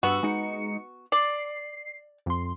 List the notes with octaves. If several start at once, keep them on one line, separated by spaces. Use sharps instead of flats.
G2 B3 F#4 E6
G#3 D#4 C#7
D5 C7
F2 C6